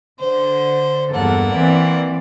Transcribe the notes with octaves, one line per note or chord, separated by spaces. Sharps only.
D3 C5
E2 G2 A#3 A4 F#5
E3 C4 D5